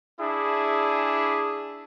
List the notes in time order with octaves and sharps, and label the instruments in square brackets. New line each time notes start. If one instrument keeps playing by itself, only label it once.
[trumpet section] D4 E4 G#4